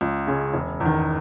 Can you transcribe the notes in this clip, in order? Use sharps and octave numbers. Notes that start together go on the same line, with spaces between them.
C#2
C#3 G#3 C#4
E1
E2
D#3